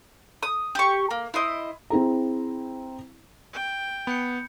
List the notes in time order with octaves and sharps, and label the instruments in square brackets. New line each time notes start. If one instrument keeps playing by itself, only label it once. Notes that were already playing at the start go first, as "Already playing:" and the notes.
[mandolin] D#6
G4 C#6
A#3
E4 C5 D#5
[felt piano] C4 E4 G#4 A#5
[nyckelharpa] G5
[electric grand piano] B3 [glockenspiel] B5 G6 C#7